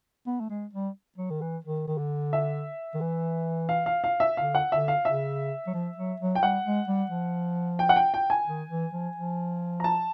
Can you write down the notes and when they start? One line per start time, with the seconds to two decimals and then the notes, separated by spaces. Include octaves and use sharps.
0.27 B3
0.40 A3
0.50 G#3
0.73 G3
1.18 F#3
1.30 D#3
1.42 E3
1.64 D#3
1.88 D#3
1.98 D3
2.33 E5
2.94 D#3
3.01 E3
3.69 F5
3.86 F5
4.04 F5
4.20 E5
4.37 D3 F5
4.55 F#5
4.71 D3 E5
4.88 F5
5.05 C#3 E5
5.67 F#3
5.74 F3
5.98 F#3
6.20 F#3
6.35 G5
6.42 G3 F#5
6.65 G#3
6.88 G3
7.10 F3
7.79 G5
7.89 F#5
7.96 G5
8.14 G5
8.30 G#5
8.47 D#3
8.70 E3
8.93 F3
9.16 F3
9.80 A#5
9.84 A5